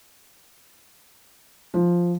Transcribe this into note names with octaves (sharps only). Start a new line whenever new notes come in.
F3